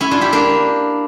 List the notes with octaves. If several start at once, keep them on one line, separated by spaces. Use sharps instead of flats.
C#4 E4
D4 F4
E4 G4
A#3 D4